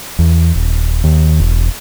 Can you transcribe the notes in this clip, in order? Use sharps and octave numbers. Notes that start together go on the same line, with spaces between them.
E2
D#1
D#2
E1